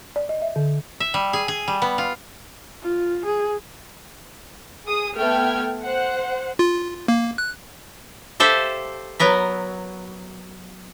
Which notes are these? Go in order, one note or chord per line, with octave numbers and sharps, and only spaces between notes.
D5
D#5
E5
D3
E5
G3
G#4
G#4
G3
B3
F4
F4
G#4
G#4 D#6
A3 B3 G5 F6 G#6
C5 F#5
F4
A#3
F#6
G4 A4 C5 E5 F5
F#3 B3 A#4 B4